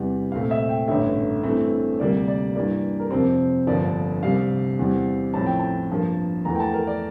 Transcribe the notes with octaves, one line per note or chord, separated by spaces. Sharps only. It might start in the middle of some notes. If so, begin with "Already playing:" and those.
Already playing: E2 C3 E3 G3
C2 A#2 A3 C4 F5
E5
G5
A1 G2 D3 A3 E5
G2 E3 A3 C4
D2 C3 G3 A#3 D5
D5
G2 E3 G3 A#3 D5
A#4
F2 C3 F3 C4 C5
G1 G2 D3 F3 A#3 D5
C2 C3 G3 C4 F5
E2 E3 G3 C4
A1 A2 F3 C4 A5
G5
A5
G2 F3 A#3
E2 E3 A3 A#5
G5
A5
A#4
D5